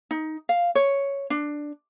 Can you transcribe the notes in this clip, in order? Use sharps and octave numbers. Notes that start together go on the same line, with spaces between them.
D#4
F5
C#5
D4